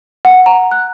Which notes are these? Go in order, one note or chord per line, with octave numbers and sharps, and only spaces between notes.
F#5
A#5
F#6